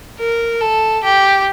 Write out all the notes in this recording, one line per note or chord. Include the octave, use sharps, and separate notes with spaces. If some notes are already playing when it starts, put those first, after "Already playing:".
A#4
A4
G4